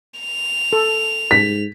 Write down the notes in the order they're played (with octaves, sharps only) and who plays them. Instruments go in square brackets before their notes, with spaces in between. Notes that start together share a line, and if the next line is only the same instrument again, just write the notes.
[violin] F7
[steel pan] A4
[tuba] G#2 [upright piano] B6